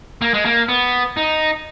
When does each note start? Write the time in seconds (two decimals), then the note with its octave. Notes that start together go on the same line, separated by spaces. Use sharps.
0.22 A#3
0.34 G#3
0.45 A#3
0.69 B3
1.17 D#4